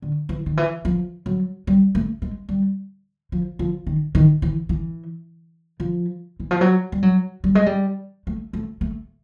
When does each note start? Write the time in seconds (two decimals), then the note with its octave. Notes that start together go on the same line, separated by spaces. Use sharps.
0.02 D3
0.29 E3
0.46 D#3
0.57 E3
0.85 F3
1.26 F#3
1.67 G3
1.95 A3
2.22 G#3
2.49 G3
3.32 F3
3.59 F3
3.87 D#3
4.15 D#3
4.42 E3
4.69 E3
5.80 F3
6.40 E3
6.51 F3
6.61 F#3
6.92 G3
7.03 F#3
7.44 G3
7.55 G#3
7.66 G3
8.27 A3
8.53 A3
8.81 A3